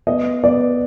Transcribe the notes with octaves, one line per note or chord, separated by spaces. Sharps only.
B3 D#5
B3 D5